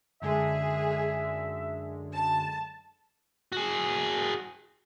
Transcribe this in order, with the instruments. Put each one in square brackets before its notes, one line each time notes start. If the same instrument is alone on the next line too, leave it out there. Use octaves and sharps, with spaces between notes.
[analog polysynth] F#2 D3 G#3 [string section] G#4 [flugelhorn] E5
[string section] A5
[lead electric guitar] F#4 G#4